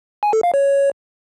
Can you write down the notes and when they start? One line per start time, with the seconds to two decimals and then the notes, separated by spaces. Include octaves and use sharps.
0.23 G#5
0.33 A4
0.43 F5
0.54 C#5